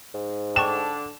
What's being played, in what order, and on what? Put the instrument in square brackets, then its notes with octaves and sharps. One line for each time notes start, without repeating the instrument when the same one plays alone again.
[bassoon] G#2
[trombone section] D3 D4 [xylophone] G5 A5 C#6 [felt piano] E7